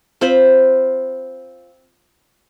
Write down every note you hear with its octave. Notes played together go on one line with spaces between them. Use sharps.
C4 F4 C5 B5